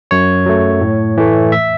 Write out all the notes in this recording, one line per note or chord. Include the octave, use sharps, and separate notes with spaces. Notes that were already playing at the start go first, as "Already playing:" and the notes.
F#2 C#5
F#3 A3
A2
E3 A3
E5